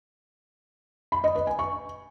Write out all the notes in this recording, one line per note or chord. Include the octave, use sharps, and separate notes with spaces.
B5
D#5
B4
G#5
C#6